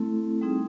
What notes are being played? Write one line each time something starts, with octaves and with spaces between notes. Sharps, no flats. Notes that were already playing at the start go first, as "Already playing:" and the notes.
Already playing: A3 C4 E4 A4
G3 C4 D#4 G#4